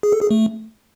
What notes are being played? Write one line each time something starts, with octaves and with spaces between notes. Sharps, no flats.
G#4
A4
G#4
A3